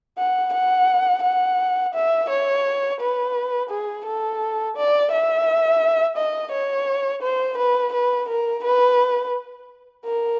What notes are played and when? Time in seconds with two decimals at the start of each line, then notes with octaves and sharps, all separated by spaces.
0.18 F#5
0.54 F#5
1.23 F#5
1.95 E5
2.30 C#5
3.00 B4
3.70 G#4
4.05 A4
4.77 D5
5.12 E5
6.17 D#5
6.52 C#5
7.22 C5
7.58 B4
7.94 B4
8.29 A#4
8.64 B4
10.05 A#4